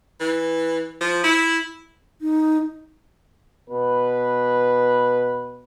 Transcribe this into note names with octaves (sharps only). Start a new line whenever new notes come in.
E3
F3
E4
D#4
B2 B4